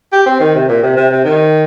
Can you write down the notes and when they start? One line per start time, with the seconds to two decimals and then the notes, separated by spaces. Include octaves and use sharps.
0.13 G4
0.26 C4
0.40 D#3
0.55 C3
0.69 A#2
0.83 C3
0.97 C3
1.11 C3
1.25 D#3